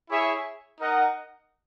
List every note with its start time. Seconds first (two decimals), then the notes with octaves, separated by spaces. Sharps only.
0.09 E4 G#4 C#5 E5
0.78 D#4 A#4 D#5 F#5